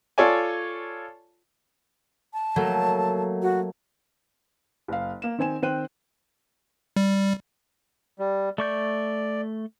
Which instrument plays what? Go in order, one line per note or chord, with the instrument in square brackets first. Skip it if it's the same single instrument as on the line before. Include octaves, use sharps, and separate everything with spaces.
[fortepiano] F4 A4 C#5 D5 G#5
[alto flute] A5
[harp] F#3 A3 A#3
[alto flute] F#4
[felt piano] F#1 F5
A#3 E7
D#3 C4 G#5 E7
D#3 C4 C5 G5 F#6 D#7
[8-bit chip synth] G3
[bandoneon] G3
[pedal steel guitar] A3 C#6 G6 [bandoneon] D5